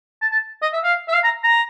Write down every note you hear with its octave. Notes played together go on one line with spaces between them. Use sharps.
A5
A5
D#5
E5
F5
E5
F5
A#5
A#5